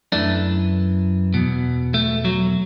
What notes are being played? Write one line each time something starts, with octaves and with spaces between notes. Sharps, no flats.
F#2 E3 A3 D4
E2 B2
A3
F#3